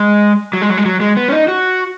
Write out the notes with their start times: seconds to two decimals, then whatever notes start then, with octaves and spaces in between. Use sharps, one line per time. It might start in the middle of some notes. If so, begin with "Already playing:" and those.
Already playing: G#3
0.53 F#3
0.62 G#3
0.70 F#3
0.78 G#3
0.85 F#3
1.01 G#3
1.17 B3
1.29 C#4
1.32 D#4
1.48 F#4